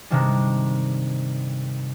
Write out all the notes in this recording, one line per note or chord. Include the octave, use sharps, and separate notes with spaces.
G2 C3 D#3 G#3 D4